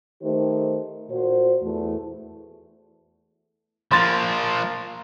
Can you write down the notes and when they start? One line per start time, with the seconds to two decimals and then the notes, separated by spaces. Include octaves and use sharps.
0.22 D#3 A3 D#4 G4 C5
1.10 A#2 F#4 C5
1.61 E2 A3
3.91 F3 A#3 C6 A6